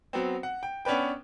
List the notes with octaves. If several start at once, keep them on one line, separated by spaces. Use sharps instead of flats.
F#3 B3 C4
F#5
G5
B3 C#4 D4 B4 G5